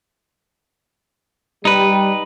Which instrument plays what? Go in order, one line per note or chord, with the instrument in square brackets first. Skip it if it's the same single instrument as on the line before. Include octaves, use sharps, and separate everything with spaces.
[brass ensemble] G3 [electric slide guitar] D#4 B4